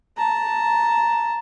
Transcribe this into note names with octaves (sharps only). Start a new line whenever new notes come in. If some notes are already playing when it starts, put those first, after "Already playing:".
A5 A#5